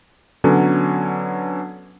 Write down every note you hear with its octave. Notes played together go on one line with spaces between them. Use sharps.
D3 F#3 B3 C#4 A4